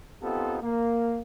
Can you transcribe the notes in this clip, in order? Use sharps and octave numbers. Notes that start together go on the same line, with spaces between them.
B3 C4 D#4 F4 G4 A4
A#3